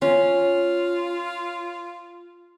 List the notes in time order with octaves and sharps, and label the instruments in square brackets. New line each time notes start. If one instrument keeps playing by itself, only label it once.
[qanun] C#4 [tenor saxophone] F4